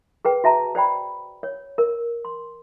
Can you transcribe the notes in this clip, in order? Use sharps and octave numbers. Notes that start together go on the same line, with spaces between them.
G#4 B4 G5
F#4 E5 A5 A#5
C5 D5 G5 B5
C#5
A#4
C6